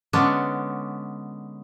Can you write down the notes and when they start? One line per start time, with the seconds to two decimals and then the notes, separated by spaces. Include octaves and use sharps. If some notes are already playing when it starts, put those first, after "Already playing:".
0.13 D3 G#3 B3 C#4 D4